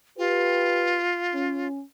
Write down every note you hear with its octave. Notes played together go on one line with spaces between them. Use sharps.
F4 G4 B4
C#4